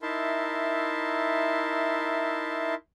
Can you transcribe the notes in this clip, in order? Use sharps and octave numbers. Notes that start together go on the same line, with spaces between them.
D#4 E4 A#4 E5 A5 C6